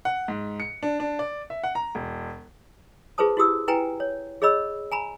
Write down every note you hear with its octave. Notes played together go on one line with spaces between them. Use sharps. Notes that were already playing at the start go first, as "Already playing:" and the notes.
F#5
G#2
C#7
D4
D4
D5
E5
F#5
A#5
E1
F4 G#4 B4 C5 A5 D#6
E4 F#4 G4 D#6 E6
E4 B4 G5 G#5 A#5
C#5
G#4 C#5 D#5 B5 E6
G#5 A#5 B5